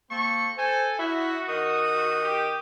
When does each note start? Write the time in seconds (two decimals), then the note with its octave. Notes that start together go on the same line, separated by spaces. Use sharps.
0.10 A#3 C4 A4 C#6
0.57 A4 C5 G#5
0.99 E4 F#4 E5
1.49 D#3 D#6
2.23 G4